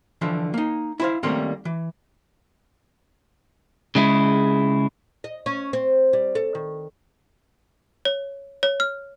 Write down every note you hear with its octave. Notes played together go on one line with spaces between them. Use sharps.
D3 E3 F3
A#3 D#4
E4 C5 F5
D#3 G3 A3 A#3 C4 C#4
E3
C#3 G#3 E4
D#5
C#4
C4
G3
A4
D#3
C#5
C#5
F6